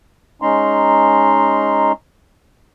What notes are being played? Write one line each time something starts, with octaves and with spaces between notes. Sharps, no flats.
G#3 C#4 D#4 A#5 C6